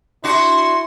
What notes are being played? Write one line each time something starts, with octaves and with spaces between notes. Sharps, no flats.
D4 E4 F#4 C6